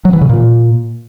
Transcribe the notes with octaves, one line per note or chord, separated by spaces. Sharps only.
F#3
E3
C#3
A#2